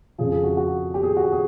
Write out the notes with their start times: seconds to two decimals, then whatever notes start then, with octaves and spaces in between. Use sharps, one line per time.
0.18 F2 C#3 F3 G#4
0.32 G#4
0.44 F#4
0.57 F#4
0.94 G4
1.03 G#4
1.17 F#4
1.23 G4
1.32 G#4